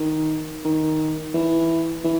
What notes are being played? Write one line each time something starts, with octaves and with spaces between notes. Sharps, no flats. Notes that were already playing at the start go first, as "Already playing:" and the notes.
Already playing: D#3
D#3
E3
E3